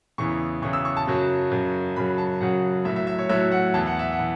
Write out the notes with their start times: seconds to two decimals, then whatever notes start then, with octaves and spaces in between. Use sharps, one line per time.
0.18 E2 C#3 E3 C#6
0.62 E2 C#3 E3 C#6
0.73 E6
0.85 C#6
0.97 A5
1.07 F#2 C#3 F#3
1.51 F#2 C#3 F#3
1.96 F#2 C#3 F#3 B5
2.18 A5
2.40 F#2 C#3 F#3 F#5
2.85 A2 E5
2.88 F#3
2.96 E5
3.07 E5
3.18 C#5
3.29 A2 F#3 E5
3.52 F#5
3.74 E2 E3 A5
3.86 F#5
3.99 E5
4.12 F#5
4.20 E3